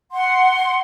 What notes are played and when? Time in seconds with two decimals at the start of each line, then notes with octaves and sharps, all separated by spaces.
0.12 F#5 C6